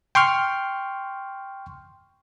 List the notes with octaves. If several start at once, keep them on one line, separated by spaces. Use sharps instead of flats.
G5 C6 C#6 F6